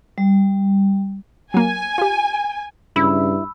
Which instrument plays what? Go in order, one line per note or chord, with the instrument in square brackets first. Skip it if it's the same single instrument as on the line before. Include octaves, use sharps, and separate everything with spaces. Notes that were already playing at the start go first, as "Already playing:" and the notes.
[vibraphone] G3
[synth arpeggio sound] F#3 A#3 [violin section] G#5
[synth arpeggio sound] F4 G4
[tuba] G2 [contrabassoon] C#3 [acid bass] E4 [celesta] B5 E6